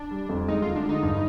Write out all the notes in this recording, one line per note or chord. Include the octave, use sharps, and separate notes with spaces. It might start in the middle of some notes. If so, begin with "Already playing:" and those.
Already playing: D4
G3
F2
G#3 D#4
D2 F4
D4
D3 D#4
G2